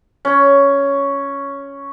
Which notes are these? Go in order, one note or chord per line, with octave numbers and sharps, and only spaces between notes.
C#4